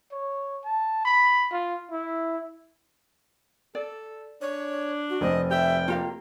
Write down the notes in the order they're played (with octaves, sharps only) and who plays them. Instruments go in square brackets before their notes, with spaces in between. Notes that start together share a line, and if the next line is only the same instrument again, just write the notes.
[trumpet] C#5
A5
B5
F4
E4
[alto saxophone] A4 [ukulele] D5
[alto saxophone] D4 [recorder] C#5
[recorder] F#4
[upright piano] F1 C4 [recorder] D#5
[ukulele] G4 [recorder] E5 [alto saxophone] G5
[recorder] A#3 [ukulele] F4 G4 F5